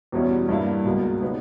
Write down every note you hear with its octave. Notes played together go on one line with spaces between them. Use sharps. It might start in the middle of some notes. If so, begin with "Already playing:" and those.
E2 B2 G3 C#4 E4
G2 G3 A#3 E4
C#2 B2 A#3
C#3 G3 B3 D#4